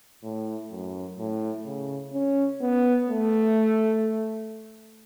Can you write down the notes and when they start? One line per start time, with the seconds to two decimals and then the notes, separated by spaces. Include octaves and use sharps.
0.24 A2
0.71 F#2
1.18 A2
1.66 C#3
2.13 C#4
2.61 B3
3.08 A3